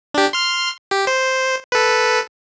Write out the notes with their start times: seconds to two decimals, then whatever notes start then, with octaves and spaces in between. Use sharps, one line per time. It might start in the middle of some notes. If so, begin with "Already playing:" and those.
0.14 D4 G4
0.33 C6 F6
0.91 G4
1.07 C5
1.72 A4 B4